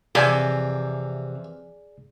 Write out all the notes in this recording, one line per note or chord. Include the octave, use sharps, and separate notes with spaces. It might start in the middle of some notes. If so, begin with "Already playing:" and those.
F2 C3 E3 G#4 D5 G#5 D6